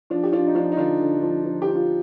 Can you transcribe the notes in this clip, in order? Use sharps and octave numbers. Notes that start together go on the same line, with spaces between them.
F3 D4 F4
G4
F3 D4 F4
D#4
F3 D4 F4
D#4
D3 D4 F4
D3
F3
F3
G4
F3
F4